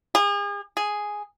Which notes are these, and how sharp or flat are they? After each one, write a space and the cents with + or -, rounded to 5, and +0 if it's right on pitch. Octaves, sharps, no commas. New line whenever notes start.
G#4 -40
G#4 +0